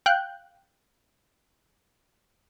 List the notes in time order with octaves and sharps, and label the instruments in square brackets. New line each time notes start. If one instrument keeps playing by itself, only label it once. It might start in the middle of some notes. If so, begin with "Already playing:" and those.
[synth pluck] F5 G5 F#6 G6